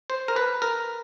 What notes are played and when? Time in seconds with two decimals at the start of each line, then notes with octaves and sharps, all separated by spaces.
0.10 C5
0.28 A#4
0.36 B4
0.62 A#4